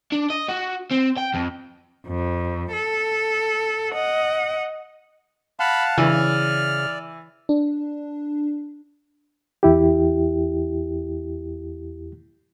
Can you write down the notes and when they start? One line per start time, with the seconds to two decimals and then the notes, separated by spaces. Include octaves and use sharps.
0.12 D4
0.30 D#5
0.48 F#4
0.91 C4
1.17 G5
1.34 F2
2.07 F2
2.73 A4
3.92 D#5 F#5
5.60 F5 F#5 A5 B5
5.98 C#3 E3 D5 F6
7.49 D4
9.63 E2 E4 G4